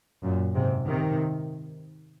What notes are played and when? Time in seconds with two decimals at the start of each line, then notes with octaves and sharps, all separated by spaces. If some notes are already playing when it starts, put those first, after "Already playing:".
0.23 F#2 A#2
0.54 G#2 C3
0.86 C3 D#3